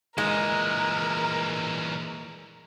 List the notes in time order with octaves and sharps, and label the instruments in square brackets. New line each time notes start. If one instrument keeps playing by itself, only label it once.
[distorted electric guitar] A#2 E3 [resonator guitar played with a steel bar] G#3 [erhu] A#4